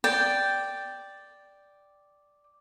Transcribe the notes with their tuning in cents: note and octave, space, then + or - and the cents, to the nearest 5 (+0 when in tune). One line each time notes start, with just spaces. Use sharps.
D5 +0 G5 +0